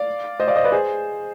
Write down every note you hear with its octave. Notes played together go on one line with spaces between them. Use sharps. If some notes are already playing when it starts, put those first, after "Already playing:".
Already playing: D5 F5
C5 D#5
D5 F5
C5 D#5
B4 D5
G#4 C5